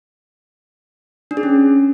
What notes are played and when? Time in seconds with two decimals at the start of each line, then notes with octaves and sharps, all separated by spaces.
1.31 D4
1.37 G#4
1.43 C#4